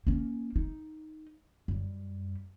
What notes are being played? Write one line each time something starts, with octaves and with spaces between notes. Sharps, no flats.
A#3 C#4
D#4
F#2 G3